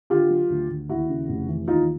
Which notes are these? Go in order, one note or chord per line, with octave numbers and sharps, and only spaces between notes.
D3 F4 G4
F#3
D2
D2
D#2 E4 F#4
C#3
F1
E3
D#2 D#4 F4